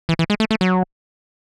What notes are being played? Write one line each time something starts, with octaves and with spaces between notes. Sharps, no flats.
E3
E3
G#3
A3
A3
F#3